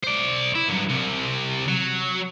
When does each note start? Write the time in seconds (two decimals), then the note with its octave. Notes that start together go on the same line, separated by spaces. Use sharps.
0.04 C5 D5
0.55 E4
0.68 G2 F#3
0.89 C2 C3
1.68 F#3